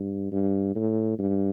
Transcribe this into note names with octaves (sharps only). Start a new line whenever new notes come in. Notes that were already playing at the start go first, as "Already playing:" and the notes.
Already playing: G2
G2
A2
G2